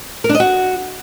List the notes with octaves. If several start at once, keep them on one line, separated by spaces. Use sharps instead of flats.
A#4
D4
D#5
F#4